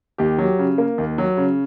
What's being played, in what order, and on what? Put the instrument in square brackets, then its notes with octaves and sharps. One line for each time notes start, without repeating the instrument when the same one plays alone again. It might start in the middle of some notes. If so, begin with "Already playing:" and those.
[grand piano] D#2 G4
F#3
C#3
A#3
D#2
F#3
C#3